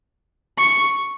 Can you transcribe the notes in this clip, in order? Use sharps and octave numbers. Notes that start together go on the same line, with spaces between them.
C#6